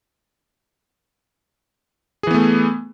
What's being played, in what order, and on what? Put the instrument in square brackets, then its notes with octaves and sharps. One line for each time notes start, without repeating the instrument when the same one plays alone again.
[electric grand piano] G#4
E3
B3
A3